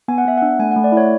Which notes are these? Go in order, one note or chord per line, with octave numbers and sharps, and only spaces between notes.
B3 G#5
F#5
B3 E5
F#5
D4
A3 G#5
F#5
A3
D5
E4
C#5